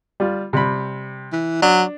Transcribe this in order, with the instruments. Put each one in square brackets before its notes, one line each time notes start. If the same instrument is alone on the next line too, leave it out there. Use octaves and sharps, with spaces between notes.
[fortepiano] G3 F4
C3 G3 B5
[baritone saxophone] E3
[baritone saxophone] F#3 [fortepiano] D4